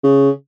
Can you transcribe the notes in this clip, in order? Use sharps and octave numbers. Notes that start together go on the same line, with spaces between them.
C#3